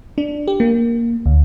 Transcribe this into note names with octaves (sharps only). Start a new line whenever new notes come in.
D4
G4
A#3
D2